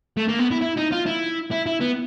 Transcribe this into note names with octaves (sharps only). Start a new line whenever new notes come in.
A3
A#3
B3
E4
E4
D#4
F4
E4
E4
E4
B3